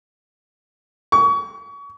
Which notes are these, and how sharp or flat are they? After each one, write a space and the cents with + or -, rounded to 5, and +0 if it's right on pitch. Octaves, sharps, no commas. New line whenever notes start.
C#6 +30